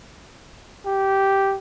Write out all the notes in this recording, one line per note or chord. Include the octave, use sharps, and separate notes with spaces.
G4